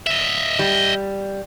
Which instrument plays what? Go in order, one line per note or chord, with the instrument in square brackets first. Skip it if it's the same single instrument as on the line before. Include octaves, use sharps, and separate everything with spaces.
[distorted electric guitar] D#5 E5
[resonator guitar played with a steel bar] G3